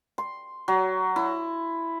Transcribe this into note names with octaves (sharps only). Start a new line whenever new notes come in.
C6
F#3
E4